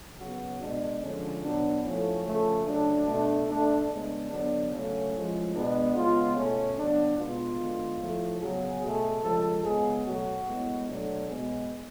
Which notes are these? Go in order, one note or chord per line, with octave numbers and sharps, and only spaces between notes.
C#3 F#3 B3 F#4
B2 G#3 B3 D4
D3 F3 G#3 C#4
B2 F#3 B3 D4
A2 F3 A3 C#4
C#3 F3 A3
C#3 F#3 A3 D4
B2 A3
B2 A3 D4
C#3 G#3 B3 D4
D3 F#3 B3 D4
C#3 F#3 A3 C#4
A2 F3 G#3
B2 G#3 B3 D4
C#3 G#3 B3 F4
B2 A3 C#4
C#3 F#3 B3 D4
B2 G#3 B3 F4
D3 G#3 B3
A2 F3 A3
C#3 F#3 B3 G#4
B2 A3
C#3 F3 G#3 A4
C#3 G#3 B3 G#4
B2 F#3 A3 F#4
A2 G#3 B3
B2 F#3 A3 D4
B2 G#3 B3 G#4